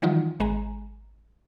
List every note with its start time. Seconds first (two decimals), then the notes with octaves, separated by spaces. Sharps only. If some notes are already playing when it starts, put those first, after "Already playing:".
0.02 D#3 E3 F#3 G3 D#4 F4
0.40 G#1 G#3 G#5 A#5